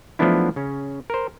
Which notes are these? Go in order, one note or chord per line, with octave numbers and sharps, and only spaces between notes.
F3 F#3 A3 B3 D4 E4
C#3 C#4
A#4 C5